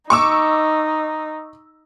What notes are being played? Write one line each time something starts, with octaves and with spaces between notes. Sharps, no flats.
D#4 C#6 D6 E6